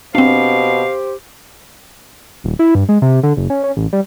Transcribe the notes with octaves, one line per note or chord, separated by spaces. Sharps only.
B2 C4 D4 G4 C5 F5
D#1
E4
G2
G#3
C3
D3
F#1
C#4
C#4
A1
G3